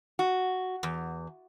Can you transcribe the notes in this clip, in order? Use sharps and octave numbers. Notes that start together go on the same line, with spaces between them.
F#4
E2